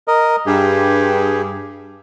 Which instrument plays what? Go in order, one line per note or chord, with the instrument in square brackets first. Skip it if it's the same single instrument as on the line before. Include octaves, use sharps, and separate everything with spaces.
[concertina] A#4 D#5
[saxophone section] G2 [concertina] G4 G#4